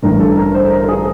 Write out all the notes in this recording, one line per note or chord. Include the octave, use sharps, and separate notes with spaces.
A1 G2 D3 A#4
A4
A#4
C5
A#4
A4
G#4